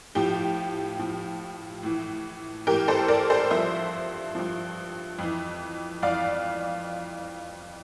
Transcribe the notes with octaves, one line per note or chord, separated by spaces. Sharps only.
A2 F3 G4
A2 F3
A2 E3
A2 E3 G4 A#4
A4 C5
A#4 D5
A4 C5
G2 F3 C5 E5
G2 F3
F2 E3
F2 E3 D5 F5